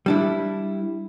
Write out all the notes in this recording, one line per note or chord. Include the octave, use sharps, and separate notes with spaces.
G3 D4 E4